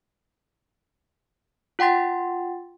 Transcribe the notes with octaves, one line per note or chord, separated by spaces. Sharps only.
F4 F#5 G5 C6 A6